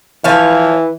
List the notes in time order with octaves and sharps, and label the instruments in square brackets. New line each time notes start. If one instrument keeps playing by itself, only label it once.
[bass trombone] E3 [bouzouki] F3 C#5 F5